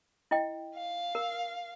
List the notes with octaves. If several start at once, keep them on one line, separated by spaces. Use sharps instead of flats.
E4 D#5 G5
F5
A#4